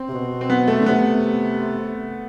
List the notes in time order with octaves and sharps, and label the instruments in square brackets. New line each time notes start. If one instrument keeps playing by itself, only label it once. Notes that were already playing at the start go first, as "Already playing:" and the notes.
Already playing: [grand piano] C4
[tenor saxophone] C3
B2
[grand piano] C4
B3
A3
[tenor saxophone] D3
[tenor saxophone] C3 [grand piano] B3